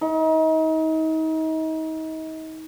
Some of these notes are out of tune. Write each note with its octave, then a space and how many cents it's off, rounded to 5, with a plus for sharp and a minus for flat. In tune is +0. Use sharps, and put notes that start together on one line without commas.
D#4 +35